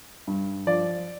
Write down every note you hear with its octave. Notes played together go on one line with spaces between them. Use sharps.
G2
F3 D5